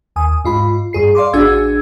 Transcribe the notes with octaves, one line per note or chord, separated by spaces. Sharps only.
D#2 G#5 D#6
G#2 F4 B5
G2 G#4 C7
D5 F5 C6 D6
A1 D4 F#4 G#4 E6 G#6